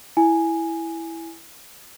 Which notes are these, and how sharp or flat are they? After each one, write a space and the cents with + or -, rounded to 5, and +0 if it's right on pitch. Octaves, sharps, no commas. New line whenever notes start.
E4 +0 G#5 +0